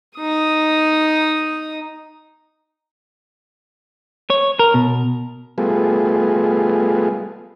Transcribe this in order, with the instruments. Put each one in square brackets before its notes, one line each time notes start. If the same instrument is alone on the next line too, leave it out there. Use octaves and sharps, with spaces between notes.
[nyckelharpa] D#4 D#6
[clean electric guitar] C#5
A#4
B2
[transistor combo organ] G3 A3 B3 F4 G#4